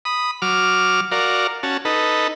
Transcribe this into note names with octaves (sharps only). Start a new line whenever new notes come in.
B5 D#6
F#3 D6 F6
F#4 A#4 D5 F5
C#4 F#4 A5
D#4 A4 B4